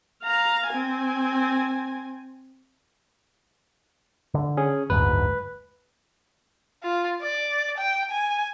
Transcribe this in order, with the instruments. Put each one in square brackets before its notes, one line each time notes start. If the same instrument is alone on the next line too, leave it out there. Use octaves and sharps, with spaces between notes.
[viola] F5 A#5
C4 G#5
[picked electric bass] D3
[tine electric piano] C#4 G#4
[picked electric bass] F#1 D2 G#2 [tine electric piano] B4
[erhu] F4
D5
G5
G#5